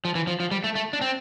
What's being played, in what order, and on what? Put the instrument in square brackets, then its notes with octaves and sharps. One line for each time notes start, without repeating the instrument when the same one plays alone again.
[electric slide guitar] F3
E3
F3
F3
G3
A3
A3
D4
C4